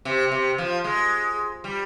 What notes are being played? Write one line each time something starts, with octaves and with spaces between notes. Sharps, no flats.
C3
C3
F3
G#3
G3